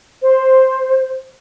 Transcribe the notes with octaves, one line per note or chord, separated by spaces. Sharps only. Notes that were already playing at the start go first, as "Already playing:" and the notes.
C5